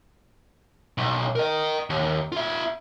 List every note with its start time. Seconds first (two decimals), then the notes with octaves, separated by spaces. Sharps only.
0.98 B1
1.36 A#4 D#5
1.90 D#2
2.32 F4 E5